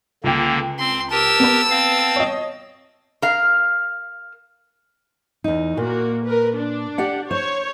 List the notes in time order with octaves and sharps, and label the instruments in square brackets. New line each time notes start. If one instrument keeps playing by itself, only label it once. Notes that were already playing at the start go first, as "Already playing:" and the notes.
[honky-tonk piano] C#2 G5 [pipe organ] D3 A#3
[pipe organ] C4 [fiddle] C6
[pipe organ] G4 A#4 [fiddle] A5 E6
[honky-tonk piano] B3 B4
[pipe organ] C4 F5
[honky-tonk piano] C#5 D#5
[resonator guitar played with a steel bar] A#4 F5
[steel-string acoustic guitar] E2 D#4
[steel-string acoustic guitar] A#2 [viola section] A#3 F#4
[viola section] A#4 B4
D4
[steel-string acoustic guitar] G4 D5 F#5
[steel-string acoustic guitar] C5 [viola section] C#5